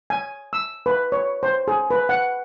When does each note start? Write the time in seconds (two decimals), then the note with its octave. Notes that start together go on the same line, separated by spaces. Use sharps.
0.10 G#5
0.53 E6
0.86 B4
1.12 C#5
1.43 C5
1.68 G#4
1.91 B4
2.09 F#5